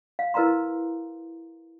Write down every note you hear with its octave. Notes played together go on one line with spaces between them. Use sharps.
F5
E4 A#4 B4 F5 A#5 C6